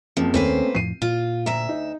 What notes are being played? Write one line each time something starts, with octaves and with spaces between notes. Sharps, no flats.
F#1 F2 F3
D#2 D#3 A3 A#3 C4 C#4 B4 C5
F2 A2 F3 C7 D#7
A#2 F4
D2 E5 A#5
D#4